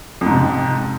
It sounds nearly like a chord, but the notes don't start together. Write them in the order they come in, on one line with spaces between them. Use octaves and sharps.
F2 G#2 C3